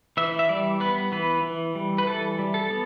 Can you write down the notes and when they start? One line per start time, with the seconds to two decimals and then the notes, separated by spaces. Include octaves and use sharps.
0.17 E3 E5
0.39 E5
0.49 G3 D5
0.80 B3 B4
1.12 E3 B4
1.43 E3
1.75 G3
1.98 B4
2.07 E3 A4
2.39 G3
2.54 A4
2.70 B3